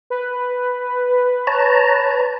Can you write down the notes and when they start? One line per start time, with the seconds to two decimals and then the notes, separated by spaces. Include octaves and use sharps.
0.10 B4
1.47 C#5 A5 A#5